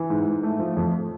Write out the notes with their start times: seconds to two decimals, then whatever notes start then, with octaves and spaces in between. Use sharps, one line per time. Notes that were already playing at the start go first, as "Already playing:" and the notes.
Already playing: E3
0.10 G#2
0.27 G#2
0.43 A3
0.59 F3
0.77 F2